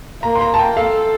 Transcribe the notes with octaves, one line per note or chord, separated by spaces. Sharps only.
A#3 A#5
C6
A#5
A5
G5
A4 F5